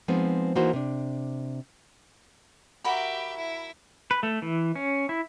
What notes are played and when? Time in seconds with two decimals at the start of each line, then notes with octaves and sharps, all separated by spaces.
0.08 F3 G#3 B3 C4 D#4
0.56 E3 A#3 D#4 F#4 C5
0.73 C3 D4
2.84 F#4 G4 A#4 E5 B5
3.36 E4
4.11 B4
4.23 A3
4.42 E3
4.76 C#4
5.09 E4